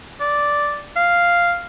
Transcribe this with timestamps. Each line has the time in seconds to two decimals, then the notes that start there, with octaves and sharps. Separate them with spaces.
0.20 D5
0.96 F5